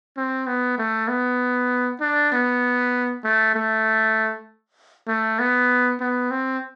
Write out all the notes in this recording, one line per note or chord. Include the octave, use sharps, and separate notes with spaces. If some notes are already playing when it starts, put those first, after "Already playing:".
C4
B3
A3
B3
D4
B3
A3
A3
A3
B3
B3
C4